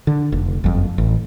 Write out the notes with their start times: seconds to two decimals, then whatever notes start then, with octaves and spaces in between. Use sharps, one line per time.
0.07 D3
0.32 F1
0.64 F#1 F2
0.98 A1